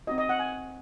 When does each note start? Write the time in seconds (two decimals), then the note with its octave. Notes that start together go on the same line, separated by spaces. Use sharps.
0.07 C4 D#4 F#4 D#5
0.18 D#5
0.29 F#5
0.39 G#5